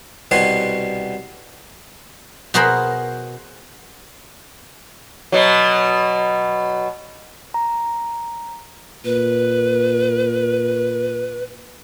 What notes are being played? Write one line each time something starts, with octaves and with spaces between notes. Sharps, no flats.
C2 B2 G3 B3 C#5 C6
B2 F#4 G#4 A#4 C5 B5
B2 F#3
A#5
A#2 B4